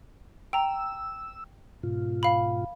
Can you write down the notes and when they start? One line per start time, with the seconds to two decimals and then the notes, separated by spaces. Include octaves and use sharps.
0.53 G5 A#5 E6
1.83 G#2 B2 F4
2.23 F5 B5